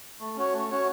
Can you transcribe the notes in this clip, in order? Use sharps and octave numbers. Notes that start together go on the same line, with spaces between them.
A3
C#4 F#4 C#5
A3
C#4 F#4 C#5